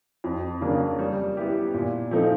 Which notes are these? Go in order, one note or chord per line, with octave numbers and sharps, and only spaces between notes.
F2
C#3 F#3 A#3 D4
G3
B3 E4 G4
A#2
F3 A3 C4 D#4